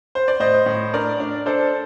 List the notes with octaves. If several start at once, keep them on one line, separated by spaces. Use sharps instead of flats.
C5
D5
A2 C5 D#5
A2
D4 A#4 D5
D4
D4 A4 C5